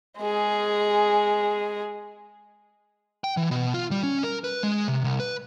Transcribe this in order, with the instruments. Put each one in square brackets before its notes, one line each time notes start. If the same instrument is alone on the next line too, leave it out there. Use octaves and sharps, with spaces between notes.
[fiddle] G#3 G#4
[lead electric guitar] G5
E3
B2
F4
G3
C#4
A#4
B4
G#3
C3
C2
B4